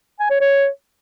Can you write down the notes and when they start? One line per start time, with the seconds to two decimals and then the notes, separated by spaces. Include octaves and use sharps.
0.20 G#5
0.30 C#5
0.40 C#5